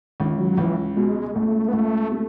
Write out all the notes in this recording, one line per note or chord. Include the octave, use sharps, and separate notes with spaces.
C#2 D#3
F#3
C#2 E3
B2 G#3
C#2 A3
B3
C#2 A3
A3